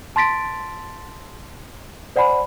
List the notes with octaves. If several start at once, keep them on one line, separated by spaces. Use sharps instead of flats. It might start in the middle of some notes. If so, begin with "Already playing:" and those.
A5 C6 A6 B6 D7
C5 D5 F#5 G#5 B5